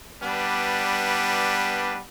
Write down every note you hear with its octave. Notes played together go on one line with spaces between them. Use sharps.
G3 B3 D4 B4